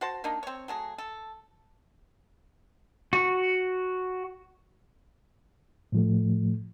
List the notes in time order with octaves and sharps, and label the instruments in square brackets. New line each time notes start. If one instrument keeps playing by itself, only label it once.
[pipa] F#4 C5 A5
A#3 D4 D#4
C4 C#5
F#3 A3 G#4
A4
[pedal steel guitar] F#4
[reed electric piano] A2 F3 A3